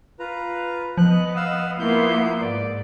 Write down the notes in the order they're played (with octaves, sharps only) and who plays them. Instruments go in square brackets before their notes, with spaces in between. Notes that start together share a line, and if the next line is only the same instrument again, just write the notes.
[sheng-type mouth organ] F4 B4 A#5
[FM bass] F3 [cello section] B3 D#5 [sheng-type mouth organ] F#6
[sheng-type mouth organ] F5 F#5 E6
[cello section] A#3 B3 F4 [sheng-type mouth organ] E4 G6
[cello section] G#2 [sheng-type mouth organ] D5